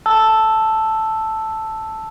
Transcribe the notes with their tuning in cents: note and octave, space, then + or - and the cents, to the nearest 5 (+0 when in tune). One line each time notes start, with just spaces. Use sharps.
A5 +0 E6 +0